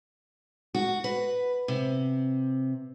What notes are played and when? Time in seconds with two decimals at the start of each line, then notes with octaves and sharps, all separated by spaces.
0.75 F#4
1.04 B4
1.68 C3